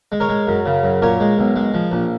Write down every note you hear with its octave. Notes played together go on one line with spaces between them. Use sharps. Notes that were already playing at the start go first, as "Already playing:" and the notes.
G#3
A#4 C#5
G#3
F#2
C#3
F#2
A#2 A#4 C#5
G#3
B1
G#3
F3
A#1